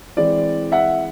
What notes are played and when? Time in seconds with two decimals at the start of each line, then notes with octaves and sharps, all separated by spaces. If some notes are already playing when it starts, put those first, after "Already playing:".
0.17 E3 G#3 C4 D5
0.72 E5 F#5